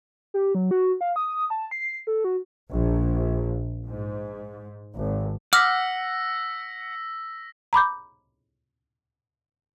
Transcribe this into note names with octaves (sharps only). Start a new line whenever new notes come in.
G4
F#3
F#4
F5
D#6
A5
C7
A4
F#4
A#1
G#2
G#1
F#5 D6 E6 F6 A#6 B6
A#5 B5 D6 G6